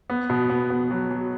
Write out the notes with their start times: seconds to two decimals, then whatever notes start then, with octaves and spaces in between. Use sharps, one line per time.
0.10 B3
0.30 B2
0.50 B3
0.70 B3
0.91 F#3
1.11 F#3